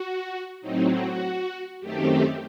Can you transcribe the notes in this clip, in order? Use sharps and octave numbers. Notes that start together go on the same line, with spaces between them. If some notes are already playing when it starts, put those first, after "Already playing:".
Already playing: F#4
A2 F#3 C4 D#4
F#4
F#2 D#3 A3 C4 G4